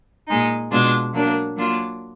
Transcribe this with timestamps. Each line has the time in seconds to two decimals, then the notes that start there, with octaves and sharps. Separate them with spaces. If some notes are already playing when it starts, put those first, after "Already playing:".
0.28 A#2 G#3 D#4
0.71 B2 G#3 D4 F4
1.13 F#3 A#3 D4
1.56 F#3 A#3 D4 F4